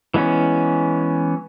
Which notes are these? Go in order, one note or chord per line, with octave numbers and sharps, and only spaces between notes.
E3 G#3 B3 C#4